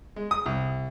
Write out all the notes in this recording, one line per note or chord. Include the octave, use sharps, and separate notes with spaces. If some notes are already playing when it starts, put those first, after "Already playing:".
G#3
D#6
C2